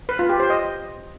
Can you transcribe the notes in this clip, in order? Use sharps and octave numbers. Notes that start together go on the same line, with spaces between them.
B4
F4
G4
C5
D#5